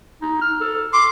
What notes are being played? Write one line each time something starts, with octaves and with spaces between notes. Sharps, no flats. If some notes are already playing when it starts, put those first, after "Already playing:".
D#4
F6
A4
C6 D6